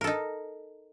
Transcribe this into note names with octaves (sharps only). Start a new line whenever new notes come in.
D#4 A4 A#4